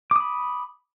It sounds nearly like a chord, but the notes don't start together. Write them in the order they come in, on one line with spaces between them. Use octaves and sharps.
D6 D#6 B5